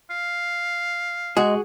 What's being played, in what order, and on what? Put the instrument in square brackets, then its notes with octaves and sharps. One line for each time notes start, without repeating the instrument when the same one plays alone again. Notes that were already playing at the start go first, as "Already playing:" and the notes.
[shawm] F5
[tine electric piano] G#3 [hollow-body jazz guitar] F#4 G#4